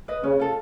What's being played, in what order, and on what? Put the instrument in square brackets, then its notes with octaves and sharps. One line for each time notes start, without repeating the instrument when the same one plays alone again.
[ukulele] B4 D#5
[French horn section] C#3 [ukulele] C#4
[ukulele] F4 A4